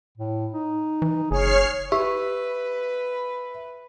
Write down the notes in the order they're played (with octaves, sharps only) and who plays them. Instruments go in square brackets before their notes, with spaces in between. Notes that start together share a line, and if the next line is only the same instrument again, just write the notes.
[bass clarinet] A2
D#4
[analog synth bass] E3
[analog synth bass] F#1 [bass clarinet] G#4 [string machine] C#5 F6 C7
[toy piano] G4 [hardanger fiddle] B4 [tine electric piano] E5